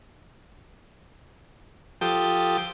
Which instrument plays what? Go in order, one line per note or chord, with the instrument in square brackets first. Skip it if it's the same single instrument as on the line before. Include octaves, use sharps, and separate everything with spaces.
[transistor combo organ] F3 G4 A4 G5 D#6